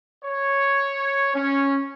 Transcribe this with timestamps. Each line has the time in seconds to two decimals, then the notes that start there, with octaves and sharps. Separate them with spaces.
0.24 C#5
1.34 C#4